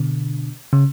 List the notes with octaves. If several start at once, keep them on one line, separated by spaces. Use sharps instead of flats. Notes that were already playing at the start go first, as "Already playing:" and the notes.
Already playing: B2 D3
C#3